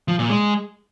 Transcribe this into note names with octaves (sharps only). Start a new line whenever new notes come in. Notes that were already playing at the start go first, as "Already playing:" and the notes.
F3
A#2
G#3